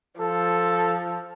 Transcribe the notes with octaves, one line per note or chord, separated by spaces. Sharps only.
F3 A4